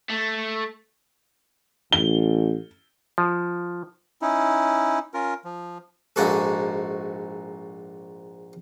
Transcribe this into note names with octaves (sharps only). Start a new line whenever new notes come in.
A3
A1 G7
F3
C#4 D#4 E4
C#4 F4 A#4
F3
A#1 G#2 F#4 A4